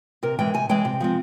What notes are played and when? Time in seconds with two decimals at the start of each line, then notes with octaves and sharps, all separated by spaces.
0.23 C3 A#4
0.39 E3 G#3 G5
0.54 C3 G#5
0.69 E3 G#3 G5
0.85 C3
1.00 F3 G#3 C4